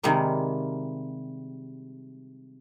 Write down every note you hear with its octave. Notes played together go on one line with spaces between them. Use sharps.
C3 D#3 G3 G#3 A#3